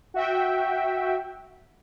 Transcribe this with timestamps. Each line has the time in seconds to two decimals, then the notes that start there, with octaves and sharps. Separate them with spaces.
0.14 F#4 E5 G5